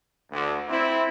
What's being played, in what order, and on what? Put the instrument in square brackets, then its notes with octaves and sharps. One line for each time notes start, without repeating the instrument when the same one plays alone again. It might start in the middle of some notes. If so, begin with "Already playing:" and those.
[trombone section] D2
C4 E4